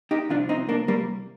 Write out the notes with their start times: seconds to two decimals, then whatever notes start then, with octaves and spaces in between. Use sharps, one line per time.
0.11 D#4 G4
0.29 C2 C3 F3 D4 F4
0.49 C4 D#4
0.69 A#3 D4
0.88 G3 A#3